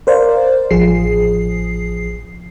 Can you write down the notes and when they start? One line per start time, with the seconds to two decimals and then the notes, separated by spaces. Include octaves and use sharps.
0.07 A#4 C5 D5 F5
0.71 A1 F3 G#4 C7